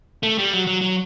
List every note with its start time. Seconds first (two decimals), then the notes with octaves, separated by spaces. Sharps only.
0.23 A3
0.38 G3
0.53 F#3
0.67 F#3
0.81 F#3